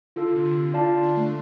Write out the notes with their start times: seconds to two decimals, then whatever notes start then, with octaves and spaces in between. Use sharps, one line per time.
0.16 D3 F4 A4 F5
0.26 D3
0.35 C3
0.45 D3
0.74 F4 D5 F5 A5
1.03 D4
1.17 A3